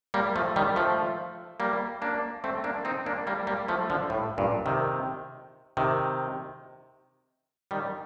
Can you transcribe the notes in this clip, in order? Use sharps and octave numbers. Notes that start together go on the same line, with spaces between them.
G3 A#3
F3 A3
D#3 G3
F3 A3
G3 A#3
A#3 D4
A3 C4
A#3 D4
C4 D#4
A#3 D4
G3 A#3
G3 A#3
F3 A3
D3 F3
A2
G2 A#2
C3 D#3
C3 D#3
D#3 G3